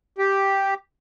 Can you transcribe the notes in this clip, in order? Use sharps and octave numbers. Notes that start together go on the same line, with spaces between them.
G4